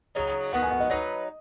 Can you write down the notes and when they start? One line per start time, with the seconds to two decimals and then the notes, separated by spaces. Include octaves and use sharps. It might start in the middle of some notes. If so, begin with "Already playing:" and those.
0.15 C#3 F#3 D#4
0.53 D#3 B3 F#4 F#5
0.62 G#5
0.71 F#5
0.80 D#5
0.90 F#3 D#4 B4